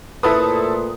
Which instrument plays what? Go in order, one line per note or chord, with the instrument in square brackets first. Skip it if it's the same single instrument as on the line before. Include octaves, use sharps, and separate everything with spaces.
[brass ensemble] A#2 A3 C5 [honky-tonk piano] E4 A4 D#6 [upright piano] B4